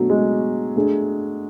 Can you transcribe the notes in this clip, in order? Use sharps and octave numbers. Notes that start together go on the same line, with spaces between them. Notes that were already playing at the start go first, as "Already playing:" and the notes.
Already playing: B2 F#3 A3 D4 F#4
G#3
A3 D4 G#4